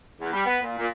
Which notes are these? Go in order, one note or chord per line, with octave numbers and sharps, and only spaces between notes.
E2
G3
B3
A#2
A#2